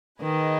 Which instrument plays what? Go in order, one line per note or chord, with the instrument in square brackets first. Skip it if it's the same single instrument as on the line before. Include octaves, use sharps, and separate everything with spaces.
[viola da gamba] D#3 [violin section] G#4 B4 D#5